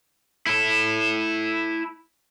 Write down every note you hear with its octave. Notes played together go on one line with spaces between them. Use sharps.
E4 A4